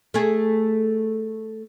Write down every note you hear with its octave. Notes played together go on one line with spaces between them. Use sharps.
A3 G#4